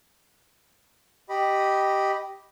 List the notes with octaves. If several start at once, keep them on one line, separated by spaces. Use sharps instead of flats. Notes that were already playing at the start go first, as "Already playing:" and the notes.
G4 D#5 B5